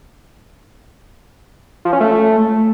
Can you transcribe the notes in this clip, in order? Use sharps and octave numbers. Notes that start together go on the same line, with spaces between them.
F3
C#4
A3